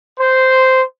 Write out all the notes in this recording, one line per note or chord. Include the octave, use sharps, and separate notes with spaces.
C5